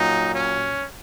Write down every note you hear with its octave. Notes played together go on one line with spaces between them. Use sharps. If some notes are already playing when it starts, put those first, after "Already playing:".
Already playing: A#2 F#3 D#4
C#4